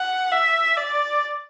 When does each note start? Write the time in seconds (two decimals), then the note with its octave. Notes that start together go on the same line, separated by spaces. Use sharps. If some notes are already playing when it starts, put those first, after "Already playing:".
Already playing: F#5
0.32 E5
0.77 D5